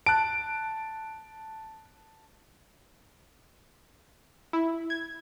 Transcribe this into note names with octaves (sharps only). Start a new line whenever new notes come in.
A5 F#6 D7
E4
G#6